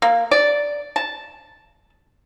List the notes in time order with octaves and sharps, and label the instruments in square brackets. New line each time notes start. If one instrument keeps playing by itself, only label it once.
[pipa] A#3
D5
A5